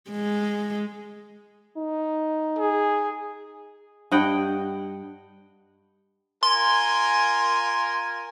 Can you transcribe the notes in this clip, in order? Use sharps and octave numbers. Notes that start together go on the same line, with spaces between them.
G#3
D#4
G#4
G2 D#5 F#5 G5
F4 A#4 G#5 C6